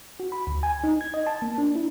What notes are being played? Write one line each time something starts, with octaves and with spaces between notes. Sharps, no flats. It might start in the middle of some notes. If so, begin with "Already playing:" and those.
F#4
B5
D2
G#5
D#4
G#6
D#5
A5
A#3
D4
E4